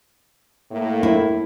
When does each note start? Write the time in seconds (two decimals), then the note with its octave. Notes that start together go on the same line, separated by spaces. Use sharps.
0.71 A2 A#3
1.03 E4